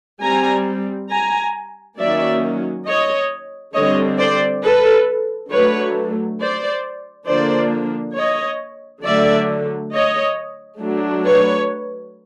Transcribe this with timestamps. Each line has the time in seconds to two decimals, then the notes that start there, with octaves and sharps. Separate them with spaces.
0.20 G3 C4 G#5 A#5
1.09 G#5 A#5
1.98 D#3 F#3 A#3 C#4 D5 E5
2.85 C#5 D#5
3.73 D3 G3 C4 C#5 D#5
4.18 C5 D5
4.63 A4 B4
5.50 D3 F#3 A3 B4 C#5
6.39 C5 D5
7.27 D3 F3 A#3 D4 C5 D5
8.16 C#5 D#5
9.04 D3 F#3 A3 D5 E5
9.91 C#5 D#5
10.80 F#3 A3 D4
11.24 B4 C#5